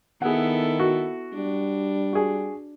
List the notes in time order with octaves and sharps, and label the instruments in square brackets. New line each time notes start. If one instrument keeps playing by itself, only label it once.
[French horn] D#3 [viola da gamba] B3 E4 A4 [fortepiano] G#4 F#5
[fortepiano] F#4
[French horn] G3 [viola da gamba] D4
[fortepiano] F#4 G#4